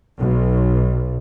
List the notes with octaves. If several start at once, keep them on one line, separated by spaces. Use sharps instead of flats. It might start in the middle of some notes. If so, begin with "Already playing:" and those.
B1